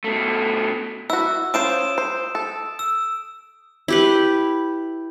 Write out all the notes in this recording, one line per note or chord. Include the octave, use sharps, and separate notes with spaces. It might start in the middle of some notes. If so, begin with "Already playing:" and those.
B2 A3
E4 F#4 E6
C#4 F4 C5 D#6 D7 E7
C5
A4
E6
E4 G4 B4